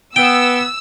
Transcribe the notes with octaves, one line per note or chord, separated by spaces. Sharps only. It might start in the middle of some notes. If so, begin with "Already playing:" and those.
B3 G5 E6